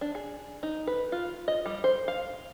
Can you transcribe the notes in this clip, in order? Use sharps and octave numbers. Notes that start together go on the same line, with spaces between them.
D4
G#4
D#4
B4
F4
D#5
G3
C5
F5